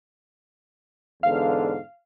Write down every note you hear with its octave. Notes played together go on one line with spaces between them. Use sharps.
E2 G#2 D3 F5